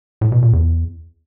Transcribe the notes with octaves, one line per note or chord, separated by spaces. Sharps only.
A2
B2
A#2
E2